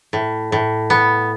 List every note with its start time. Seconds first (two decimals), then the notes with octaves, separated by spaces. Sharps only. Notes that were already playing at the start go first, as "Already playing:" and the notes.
0.13 A2
0.52 A2
0.90 B3